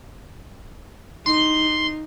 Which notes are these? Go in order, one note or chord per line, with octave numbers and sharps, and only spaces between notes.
D#4 C6